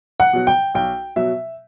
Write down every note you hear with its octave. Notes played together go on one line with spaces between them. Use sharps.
F#5
B2 F#3
G5
B1 G5
B2 F#3 E5